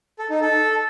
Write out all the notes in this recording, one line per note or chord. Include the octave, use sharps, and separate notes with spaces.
A4
D#4
A4